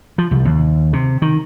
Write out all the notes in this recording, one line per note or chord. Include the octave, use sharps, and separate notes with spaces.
F3
C2
D#2
C3
D#3